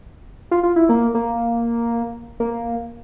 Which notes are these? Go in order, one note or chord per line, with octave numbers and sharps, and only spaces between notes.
F4
F4
E4
A#3
A#3
A#3